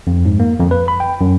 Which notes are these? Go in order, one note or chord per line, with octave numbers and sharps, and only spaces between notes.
F2
G#2
A#3
F2
B4
B5
G5
F#2